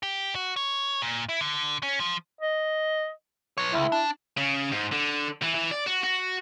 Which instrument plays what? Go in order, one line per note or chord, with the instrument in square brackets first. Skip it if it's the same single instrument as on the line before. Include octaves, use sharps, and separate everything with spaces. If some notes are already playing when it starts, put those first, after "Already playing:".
[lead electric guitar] G4
F#4
C#5
A#2
E4
D3
C#4
F3
[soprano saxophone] D#5
[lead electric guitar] B4 C#5
[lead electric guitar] C#2 [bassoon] E4
[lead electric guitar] D4
[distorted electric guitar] C#3
G#2
D3
E3
E3
D5
F#4
F#4